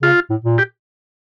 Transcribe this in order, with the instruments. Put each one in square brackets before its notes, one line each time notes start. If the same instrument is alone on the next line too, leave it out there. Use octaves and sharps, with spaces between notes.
[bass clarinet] C#3 [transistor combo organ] F4
[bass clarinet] A2
A#2
[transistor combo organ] G4